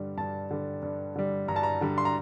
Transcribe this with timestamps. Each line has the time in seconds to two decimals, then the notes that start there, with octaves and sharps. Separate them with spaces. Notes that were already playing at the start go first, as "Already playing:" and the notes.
Already playing: G2 D3 G3
0.17 G2 A5
0.51 D3 G3
0.82 G2
1.16 D3 G3
1.48 G2 A#5
1.56 A5
1.63 A#5
1.81 D3 G3
1.98 C6
2.05 A#5